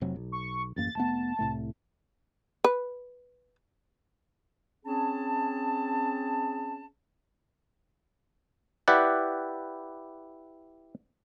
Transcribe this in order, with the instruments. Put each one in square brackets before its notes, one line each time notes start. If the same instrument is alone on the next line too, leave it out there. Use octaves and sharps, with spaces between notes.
[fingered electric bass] F1 C3 F#3
B1
[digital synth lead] C#6
[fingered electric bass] A1 F#2 A#3 [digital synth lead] A6
[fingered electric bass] F1 A3 B3 [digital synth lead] A5
[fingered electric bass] C2 A2 A3
[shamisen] B4
[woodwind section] C4 C#4 G#4 A5
[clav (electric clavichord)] E4 G4 B4 D5 F#5